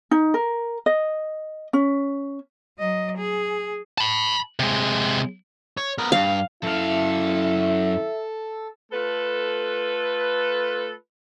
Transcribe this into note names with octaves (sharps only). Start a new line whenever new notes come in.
D#4
A#4
D#5
C#4
F#3 D#5
G#4
A5 B5
C3 G#3
C#5
B3 A#4
G2 F5
F#2 E4 A4 E5 F5
A3 F4 A4 B4